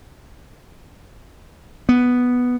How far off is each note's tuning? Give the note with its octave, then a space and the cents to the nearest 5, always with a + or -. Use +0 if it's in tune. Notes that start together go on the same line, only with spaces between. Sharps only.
B3 +0